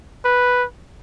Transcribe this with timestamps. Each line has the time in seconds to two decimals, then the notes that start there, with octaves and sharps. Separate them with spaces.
0.25 B4